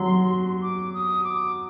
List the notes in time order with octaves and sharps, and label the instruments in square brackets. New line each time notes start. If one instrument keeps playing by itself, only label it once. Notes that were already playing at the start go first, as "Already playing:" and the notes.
Already playing: [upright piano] F#3 [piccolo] C6
[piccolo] D6
D#6
D6